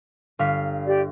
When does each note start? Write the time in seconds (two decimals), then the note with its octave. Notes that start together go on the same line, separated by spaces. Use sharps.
0.39 G1 F5 B6
0.86 G4 D5